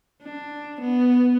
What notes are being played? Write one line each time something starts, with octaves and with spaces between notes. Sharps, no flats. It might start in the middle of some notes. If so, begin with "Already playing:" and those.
D4
B3